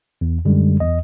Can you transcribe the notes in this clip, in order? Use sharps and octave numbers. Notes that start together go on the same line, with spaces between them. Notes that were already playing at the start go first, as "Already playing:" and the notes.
E2
F#2 D3 G3 G#3
E2 D#5